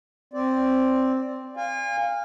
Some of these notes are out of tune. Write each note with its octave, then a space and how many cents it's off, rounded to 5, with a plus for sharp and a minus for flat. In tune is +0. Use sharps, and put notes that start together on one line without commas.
C4 +0 D5 -5
F5 +0 G#5 -35